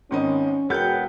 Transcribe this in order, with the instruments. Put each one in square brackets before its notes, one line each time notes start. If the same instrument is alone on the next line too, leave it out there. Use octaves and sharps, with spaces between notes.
[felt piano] G#1 D#3 D#5 [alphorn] C#4
[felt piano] E1 A#4 [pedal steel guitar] B3 G6 [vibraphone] F#4 C#5 G5 [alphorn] G#4